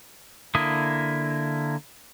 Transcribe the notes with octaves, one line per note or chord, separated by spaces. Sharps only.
D3 A#3 E4 D#6